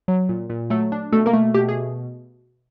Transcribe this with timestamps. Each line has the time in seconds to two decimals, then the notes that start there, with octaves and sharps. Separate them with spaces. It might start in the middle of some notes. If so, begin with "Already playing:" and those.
0.08 F#3
0.29 A#2
0.49 A#2
0.70 F#3 A3 A4
0.92 D4
1.12 B2 A3 A4
1.26 A#3 A#4
1.33 A3
1.54 B2 G4
1.69 G#4